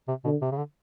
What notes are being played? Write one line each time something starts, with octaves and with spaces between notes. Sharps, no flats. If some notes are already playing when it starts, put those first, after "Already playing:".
C3
B2 D3
C3
C#3
D3